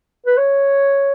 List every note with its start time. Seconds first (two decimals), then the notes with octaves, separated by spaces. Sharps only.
0.26 B4
0.37 C#5